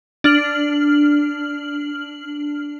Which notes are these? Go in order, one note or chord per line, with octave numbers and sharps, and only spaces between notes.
D4 F6 F#7